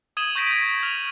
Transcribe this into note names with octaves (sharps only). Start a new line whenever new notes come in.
D#6 G#6 D#7 E7 F#7 G7
C#6 G6 A#6 B6 D7 D#7
G#6
F6 F7